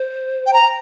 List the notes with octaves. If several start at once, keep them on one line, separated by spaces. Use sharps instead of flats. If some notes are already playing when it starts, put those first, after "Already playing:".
Already playing: C5
G5
A#5